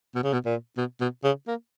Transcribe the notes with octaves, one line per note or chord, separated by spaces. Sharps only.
B2
C#3
B2
A#2
B2
B2
C#3
A#3